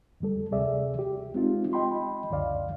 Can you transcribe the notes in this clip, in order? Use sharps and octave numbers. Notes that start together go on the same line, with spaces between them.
F2 D3 G3 A4
D2 C3 G#4 D5 E5
G4
G#3 C4 D#4 F4
D#5 G5 B5 C6
C#2 F#2 D3 D5 F5